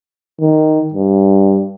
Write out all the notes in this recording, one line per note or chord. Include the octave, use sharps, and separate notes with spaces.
D#3
G2